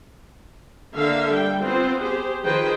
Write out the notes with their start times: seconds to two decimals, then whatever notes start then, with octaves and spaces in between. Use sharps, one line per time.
0.95 D3 A#3 E5 F5
1.31 G3 G5
1.62 B3 C4 F4 C5
2.01 G4 G#4 C5
2.44 D#3 F3 G#4 B4 C5 G5